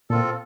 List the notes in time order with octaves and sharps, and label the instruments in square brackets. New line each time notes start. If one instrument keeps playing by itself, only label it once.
[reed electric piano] A#2 [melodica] C4 F4 A4